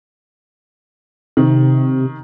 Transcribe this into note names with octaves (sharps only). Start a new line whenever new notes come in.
C3 D#3